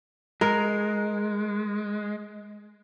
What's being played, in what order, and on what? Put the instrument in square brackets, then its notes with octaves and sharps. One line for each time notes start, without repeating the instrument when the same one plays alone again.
[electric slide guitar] G#3 [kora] A#4